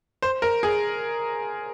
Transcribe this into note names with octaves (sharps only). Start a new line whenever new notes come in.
C5
A#4
G#4